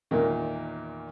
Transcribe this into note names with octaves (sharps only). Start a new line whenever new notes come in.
E2 A#2 D#3